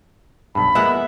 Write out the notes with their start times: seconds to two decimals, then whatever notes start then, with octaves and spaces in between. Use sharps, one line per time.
0.55 B1 G2 B5
0.75 F3 G#3 A#3 B3 E5 F#5